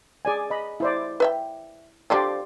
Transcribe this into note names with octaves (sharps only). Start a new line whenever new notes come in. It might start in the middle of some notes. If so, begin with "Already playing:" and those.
G#4 D5 G#5
D#5 B5
E4 C5 D5
B4 E5 G5
D3 F3 G3 G4 D5 C6